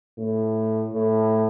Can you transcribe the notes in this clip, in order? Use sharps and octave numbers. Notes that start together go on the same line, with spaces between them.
A2
A2